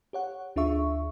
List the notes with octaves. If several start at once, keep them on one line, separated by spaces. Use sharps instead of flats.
G4 C#5 F#5
D2 D4 F4 G#4 E5 C#6